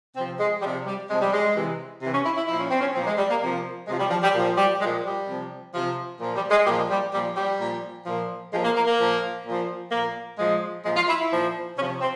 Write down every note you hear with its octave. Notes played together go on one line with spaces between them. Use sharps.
C3 F3 C4
G#3
C3 F3 G3
G3
C3 F3 G#3
G3
G#3
C3 E3
C3 E3
C#4
E4
E4
A#2 F3 E4
C#4
C4
C#4
A#2 F3 C4
A#3
G#3
G3
A#3
C3 F3 A#3
C3 F3 G#3
G3
F3
G3
A#2 F3
G3
A#2 F3 G#3
G3
C3 F3
C3 F3
A#2 F3
G3
G#3
A#2 F3 G3
G3
A#2 F3 G3
G3
A#2 F3
A#2 F3
A#2 F3 G#3
A#3
A#3
A#3
A#2 F3
A#2 F3
A#2 F3 A#3
A#2 F3 G#3
A#2 F3 G#3
F4
E4
E4
A#2 F3
C3 F3 C#4
C4